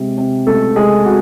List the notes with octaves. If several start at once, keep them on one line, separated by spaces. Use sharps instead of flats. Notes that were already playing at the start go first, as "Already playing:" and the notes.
Already playing: C3 G#3
C3
C#2 A3 A4
C3 G#3 G#4
C3 F#4